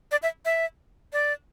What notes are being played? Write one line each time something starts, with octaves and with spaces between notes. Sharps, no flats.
D5
E5
E5
D5